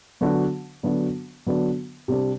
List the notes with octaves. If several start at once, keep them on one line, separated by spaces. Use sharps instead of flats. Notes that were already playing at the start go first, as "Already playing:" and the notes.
D3 F#3 B3 D4 F#4
D3 F#3 B3 D4 F#4
D3 F#3 B3 D4 F#4
C3 G3 D4 G4